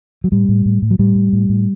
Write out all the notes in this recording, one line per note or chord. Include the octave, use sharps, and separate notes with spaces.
F#3
A2 G3
A2
A2
A2
F#3
A2 G3
A2
A2
A2